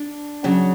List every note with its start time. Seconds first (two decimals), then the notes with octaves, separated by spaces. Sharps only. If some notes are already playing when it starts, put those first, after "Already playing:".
Already playing: D4
0.44 F#2 C#3 F#3